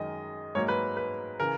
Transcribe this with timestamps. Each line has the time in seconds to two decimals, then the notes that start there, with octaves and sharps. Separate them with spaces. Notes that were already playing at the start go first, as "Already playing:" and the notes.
Already playing: F#2 D#3 G#3 D#5
0.55 G#2 F#3 A#3 C#5
0.68 B4
0.97 B4
1.40 C#3 E3 A#4